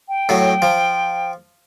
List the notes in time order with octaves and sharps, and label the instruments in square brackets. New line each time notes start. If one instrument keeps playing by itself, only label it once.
[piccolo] G5
[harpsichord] A2 F#3
F3